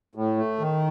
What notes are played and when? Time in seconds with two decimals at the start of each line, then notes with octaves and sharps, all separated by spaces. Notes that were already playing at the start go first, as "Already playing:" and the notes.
0.15 A2
0.37 A3
0.59 D#3